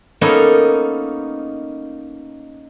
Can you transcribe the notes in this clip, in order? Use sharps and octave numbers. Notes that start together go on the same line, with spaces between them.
A#3 B3 C#4 D#4 A4